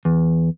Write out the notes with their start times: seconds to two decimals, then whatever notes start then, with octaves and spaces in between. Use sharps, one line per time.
0.05 E2